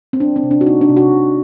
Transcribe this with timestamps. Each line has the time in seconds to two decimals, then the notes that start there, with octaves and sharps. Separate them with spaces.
0.13 C4
0.20 G3 D4
0.36 C4
0.43 C3
0.51 D4
0.61 F#4
0.66 A#3 D#4
0.81 D4
0.89 C3
0.97 F#4
1.12 C3